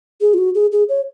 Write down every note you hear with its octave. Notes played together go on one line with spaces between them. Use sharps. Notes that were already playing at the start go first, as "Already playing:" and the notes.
G#4
F4
F#4
G#4
G#4
C#5